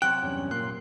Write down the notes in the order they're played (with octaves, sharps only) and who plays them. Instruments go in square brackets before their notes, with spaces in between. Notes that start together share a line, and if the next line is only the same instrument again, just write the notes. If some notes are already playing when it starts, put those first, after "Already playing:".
[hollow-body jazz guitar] C3 F#3 G5 [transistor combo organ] F#5 [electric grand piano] F#6
[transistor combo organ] E2 G2 C#4
[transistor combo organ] A#2 A#3 C6 [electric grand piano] F#6